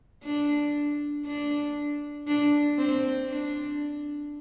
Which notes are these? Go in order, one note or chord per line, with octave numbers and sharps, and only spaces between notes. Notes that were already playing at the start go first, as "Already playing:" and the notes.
D4
D4
D4
C4
D4